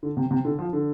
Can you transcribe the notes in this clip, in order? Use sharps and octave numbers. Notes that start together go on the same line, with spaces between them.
D3
C3
C3
D3
F3
D3